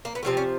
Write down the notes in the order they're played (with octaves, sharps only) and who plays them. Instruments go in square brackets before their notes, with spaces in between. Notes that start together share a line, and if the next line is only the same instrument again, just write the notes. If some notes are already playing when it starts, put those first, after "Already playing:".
[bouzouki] A#3
B3
C3 F3 A3 C4
C#4